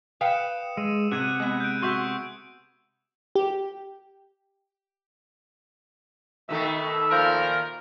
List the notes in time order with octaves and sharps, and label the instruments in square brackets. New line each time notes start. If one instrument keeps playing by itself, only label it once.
[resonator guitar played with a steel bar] B4 F5 G5 [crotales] D#6 C#7 E7
[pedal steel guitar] G#3 [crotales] E6 D#7
[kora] C3 [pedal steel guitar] F#5 [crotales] F#6 G#6 D#7
[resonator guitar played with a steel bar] G#3 B3
[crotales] G6 D7
[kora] F#4 E5 [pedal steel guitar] C6 [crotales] C#6 E6 G6
[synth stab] G4
[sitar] B2 D#3 A3 [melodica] E5 E6
[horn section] A#2 F3 A#4